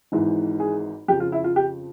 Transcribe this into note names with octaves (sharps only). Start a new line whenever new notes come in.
G#1 G#2 E3
G#4
F2 C#3 F3 G4
F4
E4
F4
G4